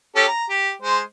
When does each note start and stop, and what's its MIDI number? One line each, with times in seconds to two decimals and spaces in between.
0.16 0.26 61
0.16 0.26 67
0.16 0.26 69
0.28 0.45 82
0.49 0.71 67
0.82 0.99 56
0.82 0.99 72